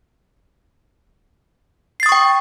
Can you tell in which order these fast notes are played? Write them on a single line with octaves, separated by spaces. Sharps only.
C7 A6 D#6 C#6 G5